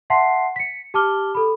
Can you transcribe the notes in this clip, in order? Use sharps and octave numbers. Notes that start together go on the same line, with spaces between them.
E5 F#5 A5 C6 B6 C7
B6 C#7
G4 A5 D6 F6 G7
A4 B5